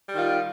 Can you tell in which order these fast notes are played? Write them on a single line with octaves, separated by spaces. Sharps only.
G3 D#3 F4